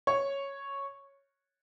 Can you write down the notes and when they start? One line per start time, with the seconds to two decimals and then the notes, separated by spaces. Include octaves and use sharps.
0.07 C#5 C#6